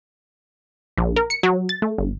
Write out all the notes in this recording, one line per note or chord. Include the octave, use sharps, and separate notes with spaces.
A#1
A#4
C#7
F#3
A6
A3
G1